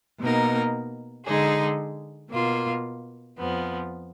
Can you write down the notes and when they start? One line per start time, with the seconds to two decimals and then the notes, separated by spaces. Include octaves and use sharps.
0.21 B2 A#3 D#4 A#4
1.26 D3 G#3 D#4 G#4
2.31 B2 A#3 F4
3.38 F2 F3 B3